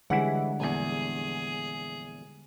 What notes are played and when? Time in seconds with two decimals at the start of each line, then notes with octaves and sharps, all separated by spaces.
0.10 D3 E3 G3 G#3 C#4 E4 F#5
0.60 A#1 E2 G#4